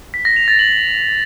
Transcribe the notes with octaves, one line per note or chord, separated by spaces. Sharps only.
B6
A#6
F7
A6
F#7